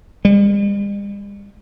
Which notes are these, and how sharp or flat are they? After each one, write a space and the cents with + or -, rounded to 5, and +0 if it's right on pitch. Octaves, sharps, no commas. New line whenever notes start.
G3 +45